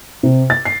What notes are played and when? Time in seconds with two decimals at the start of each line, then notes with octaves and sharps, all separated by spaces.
0.23 C3
0.50 A6
0.65 C7